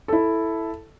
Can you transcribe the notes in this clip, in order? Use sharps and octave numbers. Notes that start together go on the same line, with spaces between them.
E4 A4